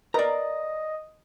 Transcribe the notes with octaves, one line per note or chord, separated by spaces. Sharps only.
A#4 B4 D5 D#5 A#5